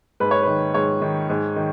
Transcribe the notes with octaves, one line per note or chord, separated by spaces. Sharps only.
G#2 B4
C#5
D#3 B4
G#2 C#5
D#3
G#2
D#3